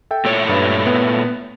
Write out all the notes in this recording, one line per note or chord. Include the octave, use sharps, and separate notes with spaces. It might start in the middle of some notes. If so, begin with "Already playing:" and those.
A4 E5 G5
A#2 A3 C#5 E6 D7
G2 B4 B5
B3